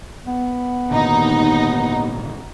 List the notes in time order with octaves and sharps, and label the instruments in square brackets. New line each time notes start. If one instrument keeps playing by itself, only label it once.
[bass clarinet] B3
[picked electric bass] G#1 A#2 D3 [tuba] D#2 [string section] D#4